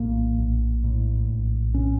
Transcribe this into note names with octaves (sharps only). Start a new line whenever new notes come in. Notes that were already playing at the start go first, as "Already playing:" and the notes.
Already playing: A#1 A2 A#3
A#1
A2
A#1
A2 C#4